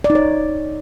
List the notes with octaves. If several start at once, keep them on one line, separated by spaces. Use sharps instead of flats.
D5
D#4
C#5